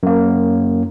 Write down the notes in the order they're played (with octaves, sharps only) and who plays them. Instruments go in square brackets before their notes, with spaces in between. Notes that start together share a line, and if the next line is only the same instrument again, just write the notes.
[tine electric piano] F#2 A#3